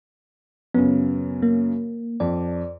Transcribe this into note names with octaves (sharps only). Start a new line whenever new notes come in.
F#2 C#3 B3
A#3
F2 D5